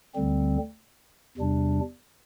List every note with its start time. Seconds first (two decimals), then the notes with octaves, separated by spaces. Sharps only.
0.15 D2 D3 G3 C4
1.37 E2 C3 G3 D4